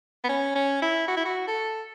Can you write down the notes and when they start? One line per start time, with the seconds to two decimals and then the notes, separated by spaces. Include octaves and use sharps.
0.24 B3
0.29 C#4
0.55 C#4
0.82 E4
1.08 F#4
1.17 E4
1.25 F#4
1.48 A4